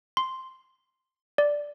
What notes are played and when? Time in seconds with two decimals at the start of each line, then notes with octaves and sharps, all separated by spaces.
0.17 C6
1.38 D5